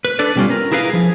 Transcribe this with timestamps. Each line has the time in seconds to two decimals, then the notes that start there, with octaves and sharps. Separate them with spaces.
0.05 B4
0.19 D4 A4 B4 D5
0.36 B2 G3 C#4 F4
0.50 A#4
0.72 E4 G#4 A#4 B4 F5
0.90 F3 G#4